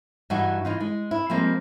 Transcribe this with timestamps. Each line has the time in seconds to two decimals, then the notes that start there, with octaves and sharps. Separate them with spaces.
0.30 G2 E3 G3 D#4 F#4
0.65 E3 D#4 F4
0.80 G#3
1.11 E4
1.30 F3 G3 G#3 A#3 C4